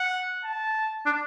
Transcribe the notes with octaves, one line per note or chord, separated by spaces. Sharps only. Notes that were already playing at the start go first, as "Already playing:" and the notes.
Already playing: F#5
A5
D4